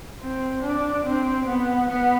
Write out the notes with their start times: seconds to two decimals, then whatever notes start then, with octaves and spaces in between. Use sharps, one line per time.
0.20 C4
0.63 D4
1.06 C4
1.47 B3
1.89 B3